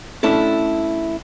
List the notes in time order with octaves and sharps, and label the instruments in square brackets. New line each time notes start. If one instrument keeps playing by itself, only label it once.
[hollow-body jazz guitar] A3 C#4 D4 E4 A4